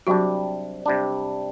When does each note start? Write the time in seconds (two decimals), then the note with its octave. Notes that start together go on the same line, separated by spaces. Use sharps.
0.07 C3 F#3 G3 D4 F#4
0.86 C3 G3 D4